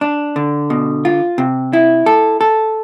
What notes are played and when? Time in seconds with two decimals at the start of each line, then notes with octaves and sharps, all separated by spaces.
0.01 D4
0.36 D3
0.70 B2
1.05 F4
1.38 C3
1.73 E4
2.06 A4
2.41 A4